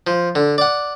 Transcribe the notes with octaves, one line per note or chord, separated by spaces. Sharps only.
F3
D3
D5 F#5